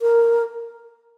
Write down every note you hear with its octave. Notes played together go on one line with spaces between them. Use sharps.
A#4